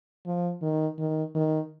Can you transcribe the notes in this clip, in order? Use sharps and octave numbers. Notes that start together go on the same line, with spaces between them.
F3
D#3
D#3
D#3